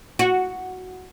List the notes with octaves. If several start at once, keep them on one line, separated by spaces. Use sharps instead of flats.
F#4